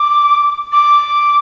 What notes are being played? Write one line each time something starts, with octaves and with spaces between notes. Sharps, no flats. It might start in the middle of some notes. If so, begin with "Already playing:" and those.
Already playing: D6
D6